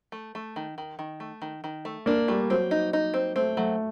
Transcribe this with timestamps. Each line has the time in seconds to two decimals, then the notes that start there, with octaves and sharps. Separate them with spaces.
0.12 A3
0.35 A3
0.56 D#3
0.78 D#3
0.99 D#3
1.20 A3
1.42 D#3
1.64 D#3
1.85 A3
2.06 A#3 D4
2.28 G3 A3
2.50 F#3 C4
2.71 D#4
2.93 D#4
3.14 C4
3.36 A3 C4
3.57 F#3 A3